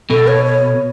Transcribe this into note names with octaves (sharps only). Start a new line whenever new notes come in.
B2 A4
C#5
C#5